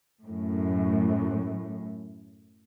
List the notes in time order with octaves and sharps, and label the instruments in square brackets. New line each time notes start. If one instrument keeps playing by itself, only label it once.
[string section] F#2 A2